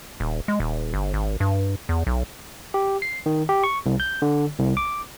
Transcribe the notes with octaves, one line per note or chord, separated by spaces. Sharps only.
D#1
G#3
D#1
G1
G#1
G2
E2
B1
G4
C7
D#3
G4
C#6
C2
G6
D3
C2
D6